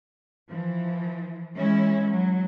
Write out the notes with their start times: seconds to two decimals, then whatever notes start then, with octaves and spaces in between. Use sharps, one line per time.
0.49 E3 F3
1.55 E3 G#3 C#4 E4
2.10 F#3